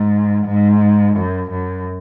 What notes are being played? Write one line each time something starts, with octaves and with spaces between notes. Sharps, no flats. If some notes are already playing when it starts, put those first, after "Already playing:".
Already playing: G#2
G#2
F#2
F#2